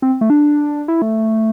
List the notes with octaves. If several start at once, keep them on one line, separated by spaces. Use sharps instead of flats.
C4
A3
D4
E4
A3